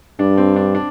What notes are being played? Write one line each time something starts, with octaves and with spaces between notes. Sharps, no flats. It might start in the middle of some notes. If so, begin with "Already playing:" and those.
G2 D4
C4
D4
D4